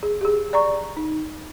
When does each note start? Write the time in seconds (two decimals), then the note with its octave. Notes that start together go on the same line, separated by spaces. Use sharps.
0.03 G#4
0.21 G4 G#4
0.53 D5 A#5 C#6
0.97 D#4